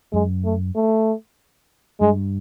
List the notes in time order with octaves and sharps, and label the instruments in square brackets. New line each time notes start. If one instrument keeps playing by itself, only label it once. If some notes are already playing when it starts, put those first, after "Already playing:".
[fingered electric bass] F#2 [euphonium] G#3
[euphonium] A3
A3
[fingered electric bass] G2 [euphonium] G#3